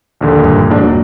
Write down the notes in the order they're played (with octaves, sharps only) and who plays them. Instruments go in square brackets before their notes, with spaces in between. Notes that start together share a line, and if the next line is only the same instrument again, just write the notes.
[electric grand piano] A#1 D#2 D3
[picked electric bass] G2 A#2
[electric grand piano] A#1 G#2 D4
[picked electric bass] D#1 A#3 [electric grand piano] F#3